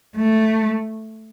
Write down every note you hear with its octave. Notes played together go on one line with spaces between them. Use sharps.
A3